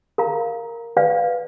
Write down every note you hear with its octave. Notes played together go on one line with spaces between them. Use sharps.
A#4 F5 A#5
B4 D5 F5